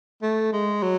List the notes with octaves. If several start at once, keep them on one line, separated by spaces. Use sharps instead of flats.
A3
G#3
F#3